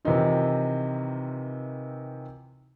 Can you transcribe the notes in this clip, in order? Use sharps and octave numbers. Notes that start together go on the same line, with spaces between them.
C3 D#3 E3 C4 D#4 F4